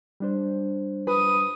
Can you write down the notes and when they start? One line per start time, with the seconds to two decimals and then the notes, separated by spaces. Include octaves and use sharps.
0.20 G3 D4 C5
1.07 B4 D#6